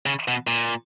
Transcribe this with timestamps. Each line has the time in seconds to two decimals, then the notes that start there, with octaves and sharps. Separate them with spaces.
0.06 C#3
0.28 B2
0.47 A#2